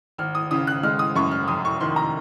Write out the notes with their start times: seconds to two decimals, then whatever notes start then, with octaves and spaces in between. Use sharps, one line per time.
0.18 G#1 F6
0.35 D#6
0.51 C#3 D#6
0.67 F#6
0.83 G#3 F6
0.99 D#6
1.16 F#2 C#6
1.31 F6
1.48 F1 D#6
1.65 C#6
1.80 D#3 C6
1.96 A#5